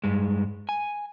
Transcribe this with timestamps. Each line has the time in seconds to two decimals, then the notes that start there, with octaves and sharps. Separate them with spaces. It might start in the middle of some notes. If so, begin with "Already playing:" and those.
0.04 G2 G#3
0.69 G#5